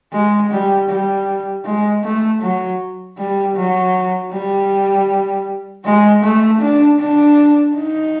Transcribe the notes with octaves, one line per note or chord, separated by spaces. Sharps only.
G#3
G3
G3
G#3
A3
F#3
G3
F#3
G3
G#3
A3
D4
D4
D#4